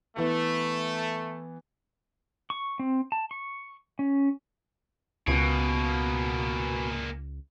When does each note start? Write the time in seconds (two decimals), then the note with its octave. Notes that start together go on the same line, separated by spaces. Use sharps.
0.17 E3 A3 B3
2.50 C#6
2.79 C4
3.12 A5
3.31 C#6
3.99 C#4
5.28 C#2 B2 A#3 G#4